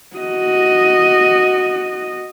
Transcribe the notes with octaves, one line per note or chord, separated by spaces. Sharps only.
F#4 D#5